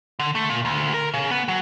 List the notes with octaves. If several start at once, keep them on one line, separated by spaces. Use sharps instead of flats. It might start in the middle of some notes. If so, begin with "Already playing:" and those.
D3
A3
A#2
D2
A#4
C#3
B3
F#3